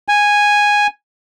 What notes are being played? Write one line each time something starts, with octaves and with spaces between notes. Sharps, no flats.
G#5